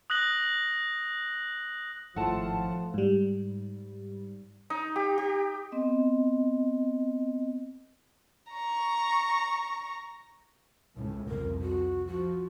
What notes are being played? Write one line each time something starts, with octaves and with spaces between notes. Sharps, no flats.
D#6 F#6 A#6 F#7
G#1 A2 F3 A3 F4 F#5 A5
G#2 G3
D#4
G4
G4
B3 C4 D#5
A#5 C#6
C#2 A2 C#3
C2 F2 A#4
F#4
F3 F#4